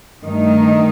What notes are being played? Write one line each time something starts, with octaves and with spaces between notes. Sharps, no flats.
G2 D#3 A3 D#4